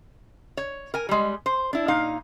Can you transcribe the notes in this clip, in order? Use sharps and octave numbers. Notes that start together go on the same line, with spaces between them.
C#5
A#4 G#5
G3 G#3
C5
D4 E4
A#2 D#4 F5